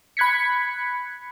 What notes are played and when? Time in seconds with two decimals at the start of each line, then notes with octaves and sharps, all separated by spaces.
0.17 B5 F#6 G#6 B6 C#7